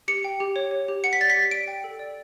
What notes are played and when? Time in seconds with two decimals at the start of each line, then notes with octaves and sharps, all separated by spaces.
0.08 G4 C#7
0.24 G5
0.40 G4
0.56 C#5
0.71 C#5
0.88 G4
1.04 F#5 C#7
1.13 B6
1.20 D5 A6
1.30 B6
1.36 G4
1.51 D5 D7
1.68 G5
1.84 A4
1.99 D5